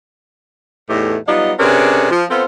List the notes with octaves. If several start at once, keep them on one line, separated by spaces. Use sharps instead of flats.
E2 A2 E3 A3 D#4 G4
F#3 G3 B3 D#4 F4 D#5
C3 C#4 D4 G#4 A#4 B4
F3
B3 C4 F4 A4 B4 C5